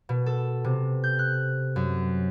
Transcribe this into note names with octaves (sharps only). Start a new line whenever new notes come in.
B2
A4
C3
G6
F#6
F#2